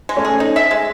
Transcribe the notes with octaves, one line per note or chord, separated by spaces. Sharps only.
G#3
A3 C#4
G#4
D#4
E5
G#3